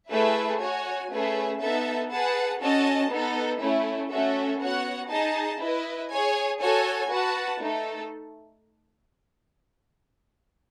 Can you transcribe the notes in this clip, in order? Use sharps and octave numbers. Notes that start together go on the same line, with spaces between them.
A3 E4 G#4 B4 E5
F#4 C#5 G#5
A3 C#4 G#4 B4 E5
B3 D#4 A4 E5 A5
G#4 B4 F#5 A5
C#4 F#4 A4 D#5 A5
B3 D#4 A4
A3 C#4 E4
A3 C#4 F#4 A4 E5
B3 F#4 C#5 F#5
D#4 G#4 D#5 A5
E4 B4 D#5
G#4 C#5 G#5
F#4 A4 C#5 G#5
F#4 B4 F#5 A5
A3 D#4 A4